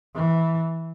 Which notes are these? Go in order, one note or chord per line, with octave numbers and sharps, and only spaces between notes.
E3